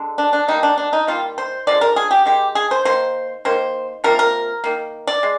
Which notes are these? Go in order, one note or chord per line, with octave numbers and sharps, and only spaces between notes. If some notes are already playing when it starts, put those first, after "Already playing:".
Already playing: D3 G#3
D4
D4
D#3 G3 A#3 D#4
D4
D4
D#4
D#3 G3 A#3 F4
C5
D3 F3 G#3 D5
A#4
G#4
G4
D#3 G#3 G4
G#4
C5
D#3 A#3 C5
D#3 A#3 C5
C3 F3 A#3 A#4
A#4
D#3 A#3
D5
G#3